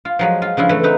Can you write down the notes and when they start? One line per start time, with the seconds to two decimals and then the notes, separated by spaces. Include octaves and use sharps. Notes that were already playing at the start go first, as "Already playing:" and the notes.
0.05 F4
0.19 F3 F#3 G#3
0.42 F4
0.57 C#3 F3 D4 E4
0.69 E3 A3
0.83 C4 D#4 B4